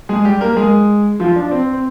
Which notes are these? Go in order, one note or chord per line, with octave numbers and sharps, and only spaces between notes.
G#3 G#4
G3 G4
A#3 A#4
G#3 G#4
F3 F4
D4
C4
C4